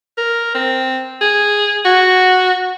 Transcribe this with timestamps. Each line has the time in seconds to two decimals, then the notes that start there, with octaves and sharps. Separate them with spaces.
0.18 A#4
0.55 C4
1.21 G#4
1.85 F#4